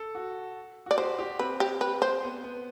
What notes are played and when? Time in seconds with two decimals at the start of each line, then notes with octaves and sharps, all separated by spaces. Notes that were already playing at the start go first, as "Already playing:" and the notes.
Already playing: A4
0.15 F#4
0.86 F#4 D5
0.98 G4 C5
1.19 G4
1.39 C4 B4
1.60 G4
1.81 B4
2.02 C5
2.23 B3
2.44 B3